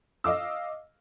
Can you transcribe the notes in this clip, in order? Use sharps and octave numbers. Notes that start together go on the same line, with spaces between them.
D#5 F5 D6 E6